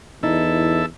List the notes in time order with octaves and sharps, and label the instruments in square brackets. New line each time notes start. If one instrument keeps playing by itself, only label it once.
[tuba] E2 [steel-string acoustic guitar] D#4 [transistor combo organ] E4 A4 E5